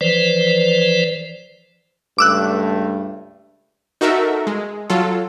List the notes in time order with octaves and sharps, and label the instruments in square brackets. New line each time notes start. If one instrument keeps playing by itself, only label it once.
[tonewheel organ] E3 F3 B4 C5 D5
[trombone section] C#2 G2 A3 [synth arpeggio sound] D6 E6 F#6
[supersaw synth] D#4 F#4 A4 A#4 E5
G#3
F#3 F4 A4